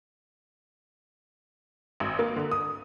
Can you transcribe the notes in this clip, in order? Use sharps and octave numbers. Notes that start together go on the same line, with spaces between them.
G#1
A#3
D3
D#6